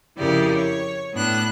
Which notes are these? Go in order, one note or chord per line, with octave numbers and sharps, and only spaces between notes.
F2 C#3 E4 G4 A#4 D5
C#5
A2 B3 D4 F#6